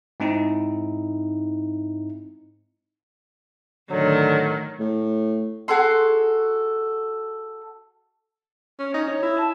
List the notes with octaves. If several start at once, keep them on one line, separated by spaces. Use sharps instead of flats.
G#2 C4 D#4 E4
A2 D3 D#3 F#3
A2
F#4 G#4 A4 C6
C#4
C#4 D#4
D#4 C#5
E4
A5